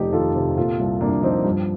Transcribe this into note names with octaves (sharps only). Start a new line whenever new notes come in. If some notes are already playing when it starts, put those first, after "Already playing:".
Already playing: F1 F2 D#4 G4
D#3 F4 A4
C3
A#2 F4 A4
C2
C2 A#3 D4
F3 C4 D#4
G2